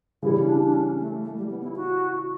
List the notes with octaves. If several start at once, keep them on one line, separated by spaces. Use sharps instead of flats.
C#3 E3 G3 E4
C#4
D4
D4
C#4
A3
A3
G3
B3
E4
F#4